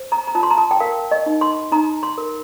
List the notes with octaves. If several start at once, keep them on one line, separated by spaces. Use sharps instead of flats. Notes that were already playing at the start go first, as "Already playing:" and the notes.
Already playing: C5
A#5
A#5
F4 A5
C6
A#5
A5
G5
A#4 F5
D#5
D#4
C6
D#4 A#5
C6
A#4